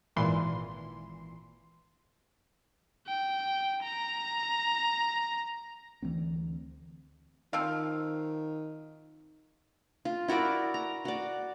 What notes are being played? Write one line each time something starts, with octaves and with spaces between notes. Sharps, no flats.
G#1 A#2 E3 C6
G5
A#5
D2 E3 A#3 C4
D#3 F3 C4 F5
F4
E4 F#4 A#4 D5
A#5
F#4 D5